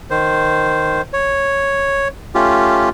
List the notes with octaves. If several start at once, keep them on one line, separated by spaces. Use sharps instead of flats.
D#3 C5
C#5
A3 C#4 F4 G4